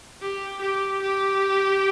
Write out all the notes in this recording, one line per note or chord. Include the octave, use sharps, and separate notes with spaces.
G4
G4
G4